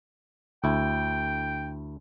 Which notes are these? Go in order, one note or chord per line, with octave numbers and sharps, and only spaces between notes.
D2 E4 G5